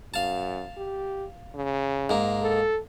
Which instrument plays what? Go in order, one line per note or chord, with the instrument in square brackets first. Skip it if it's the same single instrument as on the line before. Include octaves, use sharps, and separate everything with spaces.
[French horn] F#2 [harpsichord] F5 A5
[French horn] G4
C#3
[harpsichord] G#2 A#3
[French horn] A4